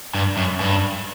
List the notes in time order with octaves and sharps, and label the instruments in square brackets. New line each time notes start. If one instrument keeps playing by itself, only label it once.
[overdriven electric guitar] G2
F#2
G2